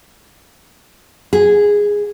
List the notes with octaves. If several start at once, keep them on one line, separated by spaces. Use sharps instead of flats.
G#4